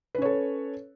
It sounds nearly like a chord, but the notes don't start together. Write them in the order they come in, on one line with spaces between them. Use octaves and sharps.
B4 C#4 C#5 A4